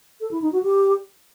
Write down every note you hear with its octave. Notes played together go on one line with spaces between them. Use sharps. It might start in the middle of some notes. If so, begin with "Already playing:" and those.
A4
E4
D#4
F#4
G4